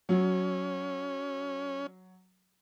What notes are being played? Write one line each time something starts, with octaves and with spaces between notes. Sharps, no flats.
F#3 C#4